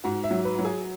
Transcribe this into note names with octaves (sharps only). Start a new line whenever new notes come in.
G#2 F#4
E5
F#3
B4
F#3
G#4